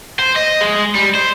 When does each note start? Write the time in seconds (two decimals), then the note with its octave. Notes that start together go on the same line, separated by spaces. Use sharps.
0.19 C5
0.36 D#5
0.61 G#3
0.95 G3
1.15 C5